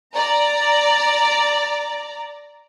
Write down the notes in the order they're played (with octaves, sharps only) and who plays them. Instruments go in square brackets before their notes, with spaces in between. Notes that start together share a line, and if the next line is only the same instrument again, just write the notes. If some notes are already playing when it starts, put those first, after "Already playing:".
[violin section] D5 A#5